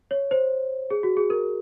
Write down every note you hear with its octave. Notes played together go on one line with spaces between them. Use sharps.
C#5
C5
G#4
F#4
G#4
A#4